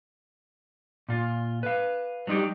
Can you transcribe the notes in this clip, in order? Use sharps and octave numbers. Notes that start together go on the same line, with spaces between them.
A#2 F4
B4 F5
F#3 G3 D#4 F4 G4